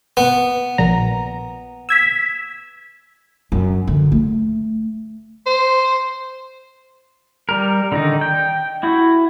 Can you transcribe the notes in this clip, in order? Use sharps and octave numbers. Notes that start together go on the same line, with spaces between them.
B3
A#1 A#2 A#5
E6 G#6 B6
F#2
D3
A3
C5
G3 A#4
D3 D#3 D#4
G5
E4 F#4